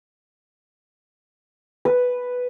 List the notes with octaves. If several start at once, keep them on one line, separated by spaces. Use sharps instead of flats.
B4